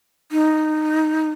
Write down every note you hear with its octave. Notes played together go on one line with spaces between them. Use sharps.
D#4